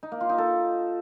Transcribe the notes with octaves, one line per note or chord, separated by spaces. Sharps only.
D#4
A#3
F4
D#4
A4